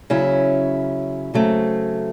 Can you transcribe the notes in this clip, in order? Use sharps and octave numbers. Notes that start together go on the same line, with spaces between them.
C#3 F#3 C#4 E4
C#3 F#3 A3 C4